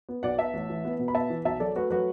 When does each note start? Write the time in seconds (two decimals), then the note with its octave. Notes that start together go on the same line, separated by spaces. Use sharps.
0.09 B3
0.23 B1 D5 F#5
0.38 B3 E5 A5
0.54 A1
0.70 E3
0.85 B3
0.99 B2
1.08 B5
1.14 B3 E5 A5
1.30 E3
1.45 B1 E5 A5
1.60 F#3 A4 D5
1.76 A3 F#4 B4
1.90 F#3 F#4 B4